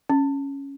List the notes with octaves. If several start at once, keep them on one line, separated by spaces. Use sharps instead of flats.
C#4